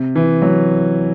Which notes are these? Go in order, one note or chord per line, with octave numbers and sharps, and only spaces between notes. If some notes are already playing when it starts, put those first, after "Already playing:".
Already playing: C3
E3
F#3